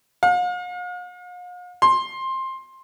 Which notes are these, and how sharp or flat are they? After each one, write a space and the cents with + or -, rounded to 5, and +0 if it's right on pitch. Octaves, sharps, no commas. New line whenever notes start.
F5 +45
C6 +15